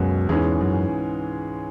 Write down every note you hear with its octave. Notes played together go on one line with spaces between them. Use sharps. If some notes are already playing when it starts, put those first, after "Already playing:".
Already playing: C#2 F#2 B2 G#3 C#4 F#4
E2 G#2 E3 G#3 C#4 G#4
F#2